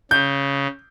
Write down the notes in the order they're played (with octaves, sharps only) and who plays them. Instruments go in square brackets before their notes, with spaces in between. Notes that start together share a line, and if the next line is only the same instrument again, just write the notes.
[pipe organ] C#3 [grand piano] G6